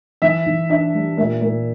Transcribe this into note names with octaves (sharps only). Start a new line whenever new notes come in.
E3 E5
E3
D4 E5
G3
A#2 E5
A#2